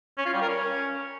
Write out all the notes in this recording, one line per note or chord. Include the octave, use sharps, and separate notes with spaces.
C#4
F4
G3
A#4
C#4